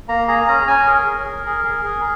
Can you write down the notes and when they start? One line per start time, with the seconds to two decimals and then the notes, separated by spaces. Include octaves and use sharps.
0.09 A#3 A#5
0.28 G#4 A#5
0.48 C#4 A#5
0.67 C#4 G#5
0.86 G#4 A#4
1.06 G#4
1.25 G#4
1.46 G#4
1.65 G#4
1.85 G#4